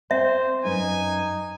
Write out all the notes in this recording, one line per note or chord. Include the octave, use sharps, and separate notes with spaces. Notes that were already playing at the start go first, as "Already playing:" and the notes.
C4 C5 E5
F#2 C#4 D#4 B4 G#5